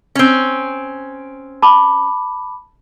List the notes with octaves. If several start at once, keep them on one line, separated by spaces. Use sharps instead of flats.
C4 C#4
A5 B5 D6